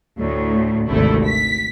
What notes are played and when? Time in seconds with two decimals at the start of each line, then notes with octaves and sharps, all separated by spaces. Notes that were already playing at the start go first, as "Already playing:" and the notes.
0.18 D2 A2
0.87 G#1 D2 C3 A3 E4
1.24 B6